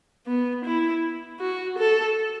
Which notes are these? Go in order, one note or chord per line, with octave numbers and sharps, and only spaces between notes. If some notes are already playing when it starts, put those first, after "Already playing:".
B3
E4
F#4
A4